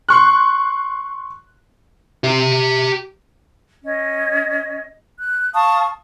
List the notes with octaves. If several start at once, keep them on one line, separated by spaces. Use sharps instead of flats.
C6 C#6 F#6
G4 E5
C#4 D#5
F#6
F5 A5 C#6 D#6